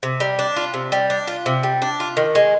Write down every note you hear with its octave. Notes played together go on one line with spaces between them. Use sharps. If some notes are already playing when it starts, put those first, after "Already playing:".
C3
G3
D4
F4
C3
G3
D4
F4
C3
G3
D4
F4
D#3
G#3